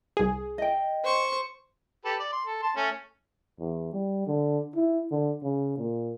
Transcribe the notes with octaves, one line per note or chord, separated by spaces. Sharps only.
C2 G#4
D#5 G5
C5 C#6
G4 A4 B4
D5
C6
A4
A5 C6
A3 C#4
E2
G3
D3
E4
D3
C#3
A#2